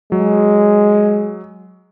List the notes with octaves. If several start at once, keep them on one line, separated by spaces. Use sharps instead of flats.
F#3 G#3